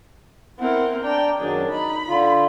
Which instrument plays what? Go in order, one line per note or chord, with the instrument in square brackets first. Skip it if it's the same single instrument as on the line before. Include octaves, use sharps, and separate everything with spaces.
[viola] C4 A#4 [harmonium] E4 F#5
[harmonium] D4 D5 A#5 [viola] G5
[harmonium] F#2 D#3 F#3 [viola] D4 G#4
[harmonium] D#4 [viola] B5
[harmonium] D3 F4